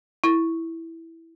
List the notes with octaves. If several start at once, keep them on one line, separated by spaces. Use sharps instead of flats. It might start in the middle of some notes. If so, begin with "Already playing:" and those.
E4